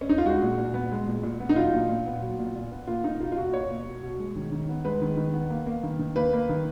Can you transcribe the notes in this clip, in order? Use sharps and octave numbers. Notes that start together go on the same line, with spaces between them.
C#4
D#4
F4
G#3 F#4
A#2
A#2
B3
G#3
A#2
A#2
B3
D#4
F#3 F4
A#2
A#2
B3
F#3
A#2
A#2
B3
A#3 F4
A#3 D#4
B2 F4
F4
B2 F#4
A#3 C#5
A#3
B2
B2
G#3
D#3
D#3
B3
G#3 B4
D#3
D#3
B3
A#3
A#3
D#3
D#3
A#3 B4
A#3
D#3